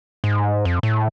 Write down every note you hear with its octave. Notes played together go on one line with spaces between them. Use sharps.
G#2
F2
A2